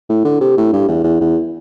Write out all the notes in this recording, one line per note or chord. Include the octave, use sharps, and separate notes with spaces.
A2
D3
C3
A2
G2
E2
E2
E2